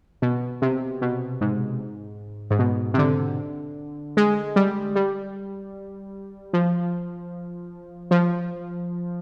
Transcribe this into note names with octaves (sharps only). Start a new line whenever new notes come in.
B2
C3
B2
G#2
G#2
B2
C3
D3
G#3
G3
G3
F3
F3